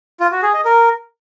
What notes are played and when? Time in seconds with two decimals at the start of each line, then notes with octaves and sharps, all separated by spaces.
0.20 F4
0.31 F#4
0.43 G#4
0.54 D#5
0.65 A#4